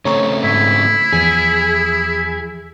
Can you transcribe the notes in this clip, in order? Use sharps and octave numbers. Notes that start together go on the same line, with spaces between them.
C#3 A3 C4 C#5 A#5 C#6
G#2 E4
E2 E3 F3 G#4